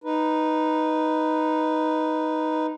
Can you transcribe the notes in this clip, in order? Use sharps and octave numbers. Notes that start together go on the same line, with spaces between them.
D#4 B4